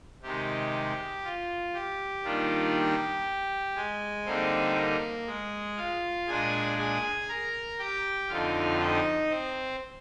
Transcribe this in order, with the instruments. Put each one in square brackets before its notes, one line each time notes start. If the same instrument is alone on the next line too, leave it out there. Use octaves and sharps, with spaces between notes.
[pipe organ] C3 D#3 G#3 G4
F4
G4
D#3 G3 A#3 D4 F4
G4
G#3 G#4
D3 G3 A#3 C4 D#4 C5
A#3 A#4
G#3 G#4
F4 F5
A#2 G#3 D4 G#4 G#5
G#4 G#5
A#4 A#5
G4 G5
F2 D3 F3 C4 D#4 F4 F5
D#4 D#5
C4 C5